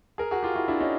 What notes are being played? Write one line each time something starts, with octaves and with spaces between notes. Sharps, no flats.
G#4 A#4
F#4 G#4
F4 G4
E4 F#4
D4 E4
C#4 D#4